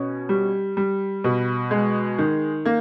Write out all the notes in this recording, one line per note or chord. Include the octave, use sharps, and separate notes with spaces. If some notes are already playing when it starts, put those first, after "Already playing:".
Already playing: B2 C#4
G3
G3
B2
G#3
D#3
A#3